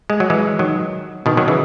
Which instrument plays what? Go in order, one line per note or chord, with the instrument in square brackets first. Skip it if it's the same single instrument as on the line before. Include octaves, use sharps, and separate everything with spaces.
[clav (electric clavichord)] G#3
F#3
E3 G#3
D#3 F#3
B2 D#3
D#3 F#3
C#3 E3